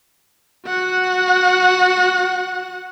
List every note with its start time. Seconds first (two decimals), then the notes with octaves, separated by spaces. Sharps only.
0.67 F#4 F#5